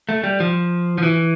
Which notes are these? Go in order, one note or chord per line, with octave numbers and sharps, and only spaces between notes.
A3
G3
F3
F3
E3